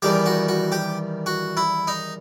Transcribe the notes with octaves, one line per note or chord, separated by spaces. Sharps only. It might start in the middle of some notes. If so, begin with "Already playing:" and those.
E2 D#3 G3 G4
F#4
F#4
G4
F#4
E4
D#4